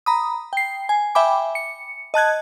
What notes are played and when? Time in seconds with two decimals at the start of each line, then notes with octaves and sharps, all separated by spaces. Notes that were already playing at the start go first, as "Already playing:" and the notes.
0.06 A#5 B5 D#6
0.53 G5 C7
0.89 G#5
1.15 E5 G5 G#5 B5 D6
1.55 C#7
2.14 D#5 A5 F#6 G#6